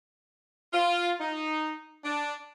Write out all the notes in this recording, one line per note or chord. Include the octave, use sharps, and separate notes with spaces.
F4
D#4
D4